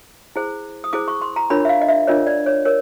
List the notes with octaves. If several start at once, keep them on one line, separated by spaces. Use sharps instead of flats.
E4 G#4 C5
D#6
E4 G#4 C5 D6
C#6
C6
A#5
D4 F4 A#4 C#5 B5
E5
F5
D#5
E5
D4 F4 A#4 C#5 D#5
D5
C#5
A#4 C#5